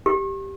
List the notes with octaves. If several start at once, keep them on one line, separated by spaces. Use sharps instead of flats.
G4